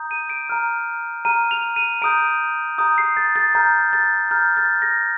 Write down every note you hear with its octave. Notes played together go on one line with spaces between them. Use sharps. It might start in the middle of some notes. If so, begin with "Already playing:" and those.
Already playing: A#5 D#6 G6
D#7
D7
A#5 F6
A#5 F6 D#7
F7
D#7
A#5 D#6 G6 D7
A#5 D#6 G6
C7
A6
A6
A#5 F6 G6
A6
A#5 F6 G6
A6
A#6